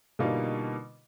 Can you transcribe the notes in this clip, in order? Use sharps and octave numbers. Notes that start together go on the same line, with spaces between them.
B2 D3 G3 A#3 D#4 F4